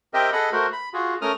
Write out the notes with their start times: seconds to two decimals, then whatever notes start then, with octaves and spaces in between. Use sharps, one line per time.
0.14 C4 G4 A#4 D#5 E5 G5
0.32 G#4 A4 D#5 F#5 B5
0.52 A3 F#4 A#4 C5
0.72 B5
0.94 F4 F#4 G#4
1.22 A3 C#4 A#4 D#6 F6